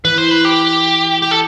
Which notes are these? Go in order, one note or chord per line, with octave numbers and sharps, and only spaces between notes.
E3 B4
C5
B4
G4
G4
A4